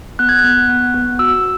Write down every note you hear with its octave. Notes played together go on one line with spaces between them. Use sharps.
B3 F#6
G#6
F#6
B3
B3
B3
F#4 E6